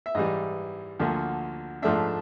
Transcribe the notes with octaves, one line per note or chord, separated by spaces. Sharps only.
E5
G#2 E3 G3 D#5
D2 D3 F3 A#3
G#2 F3 A3 D4 E5